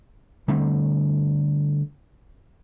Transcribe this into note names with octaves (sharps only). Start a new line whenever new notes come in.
D3 G3 A3 C4